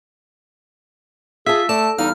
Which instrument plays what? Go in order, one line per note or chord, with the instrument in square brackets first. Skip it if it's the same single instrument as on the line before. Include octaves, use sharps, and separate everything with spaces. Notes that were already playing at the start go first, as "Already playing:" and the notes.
[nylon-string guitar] F4 A5 [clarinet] G#4 [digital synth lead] E5 [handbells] E6
[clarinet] A3 [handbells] A4 [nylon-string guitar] D5 [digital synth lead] A5
[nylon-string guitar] E2 G3 F5 [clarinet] D#4 [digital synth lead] F6